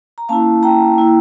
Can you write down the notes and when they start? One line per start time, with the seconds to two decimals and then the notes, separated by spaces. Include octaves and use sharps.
0.18 A#5
0.29 A#3 C#4 E4 F5 A5
0.63 G5 A#5
0.98 A#3 E4